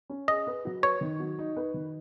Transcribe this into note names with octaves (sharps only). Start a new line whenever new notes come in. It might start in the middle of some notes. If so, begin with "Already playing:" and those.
C#4
G#4 D#5
B4
F#3
B4 C#5
D#3
F#3
D#4
B4
D#3